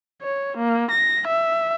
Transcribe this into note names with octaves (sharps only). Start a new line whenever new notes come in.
C#5
A#3
A#6
E5